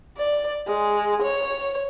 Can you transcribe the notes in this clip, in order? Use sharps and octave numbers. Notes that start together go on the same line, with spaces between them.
D5
G#3
C#5